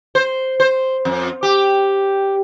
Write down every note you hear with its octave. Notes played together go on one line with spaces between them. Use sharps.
C5
C5
F2
G4